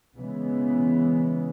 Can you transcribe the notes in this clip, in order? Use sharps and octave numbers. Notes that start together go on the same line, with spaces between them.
C#3 E3 G#3 B3